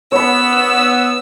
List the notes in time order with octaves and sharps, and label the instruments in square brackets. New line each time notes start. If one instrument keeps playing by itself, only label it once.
[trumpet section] B3 [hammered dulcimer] C#5 B5 [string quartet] E6